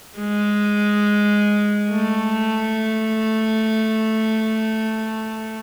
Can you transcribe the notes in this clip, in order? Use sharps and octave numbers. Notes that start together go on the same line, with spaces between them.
G#3
A3